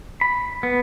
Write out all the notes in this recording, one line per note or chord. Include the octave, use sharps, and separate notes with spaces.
B5
B3